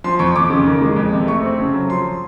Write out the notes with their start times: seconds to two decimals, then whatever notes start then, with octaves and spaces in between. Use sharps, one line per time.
0.04 F3 C6
0.19 F2 C#6
0.36 F2 D6
0.50 C#3
0.66 D#3
0.81 G#3
0.96 F2
1.12 C3
1.27 A3 C#6
1.43 C4
1.58 C#3
1.74 F#3
1.89 F3 C6